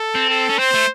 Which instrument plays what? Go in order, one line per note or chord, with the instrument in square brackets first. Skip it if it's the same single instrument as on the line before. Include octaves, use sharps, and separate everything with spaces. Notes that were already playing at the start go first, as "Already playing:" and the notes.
Already playing: [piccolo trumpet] A4
[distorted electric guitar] C4
[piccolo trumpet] A4
[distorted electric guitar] C#4
[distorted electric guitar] C4 [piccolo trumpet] C5
[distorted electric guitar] A3